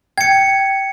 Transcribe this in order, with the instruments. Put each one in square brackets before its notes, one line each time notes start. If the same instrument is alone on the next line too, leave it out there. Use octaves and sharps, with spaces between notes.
[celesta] G5 [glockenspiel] G#6 C#7